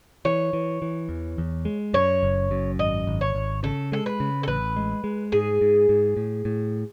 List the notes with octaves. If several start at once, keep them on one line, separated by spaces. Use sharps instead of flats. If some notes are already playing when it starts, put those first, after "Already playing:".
E3 C#5
E3
E3
E2
E2
G#3
F#2 C#5
F#1
F#2
G#1 D#5
G#1
C#5
G#1
C#3 A4
G#3 A4
B4
C#3
A4
A1 B4
G#3
G#3
G#2 G#4
G#2
G#2
A2
A2